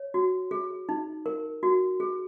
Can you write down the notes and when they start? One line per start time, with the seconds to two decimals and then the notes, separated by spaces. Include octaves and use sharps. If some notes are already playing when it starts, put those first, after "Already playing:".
Already playing: C#5
0.14 F#4
0.51 G#4
0.89 D#4
1.26 A#4
1.63 F#4
2.00 G#4